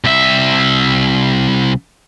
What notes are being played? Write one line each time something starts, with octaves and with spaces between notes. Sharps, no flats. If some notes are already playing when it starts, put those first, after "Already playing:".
C2 E5